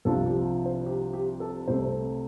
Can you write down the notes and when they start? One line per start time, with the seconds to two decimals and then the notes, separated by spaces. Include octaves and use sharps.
0.05 C2 C3 F3 D4 F4 A4
0.26 G4
0.66 C5
0.86 G4
1.13 G4
1.40 A4
1.68 C2 C3 A3 C4 C5